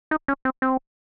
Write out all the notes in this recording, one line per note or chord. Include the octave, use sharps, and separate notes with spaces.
D#4
C#4
C4
C4